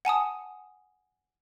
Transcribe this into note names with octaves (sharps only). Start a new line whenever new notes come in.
F#5 G#5 A5 D#6